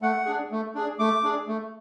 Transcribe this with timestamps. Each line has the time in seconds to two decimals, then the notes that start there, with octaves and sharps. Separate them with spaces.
0.02 A3 F#5
0.26 D4 G#4
0.51 A3
0.75 D4 G#4
0.99 A3 D6
1.24 D4 G#4
1.47 A3